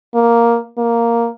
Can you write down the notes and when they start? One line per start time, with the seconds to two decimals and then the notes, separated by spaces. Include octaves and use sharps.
0.14 A#3
0.78 A#3